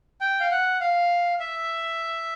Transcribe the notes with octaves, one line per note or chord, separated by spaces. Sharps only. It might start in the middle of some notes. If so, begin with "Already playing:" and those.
G5
F5
F#5
F5
E5